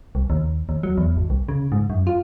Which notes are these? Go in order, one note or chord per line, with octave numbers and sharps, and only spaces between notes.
C2
D#2
D#2
F#3
E2
G#1
C2
C#3
G#2
F#2
F4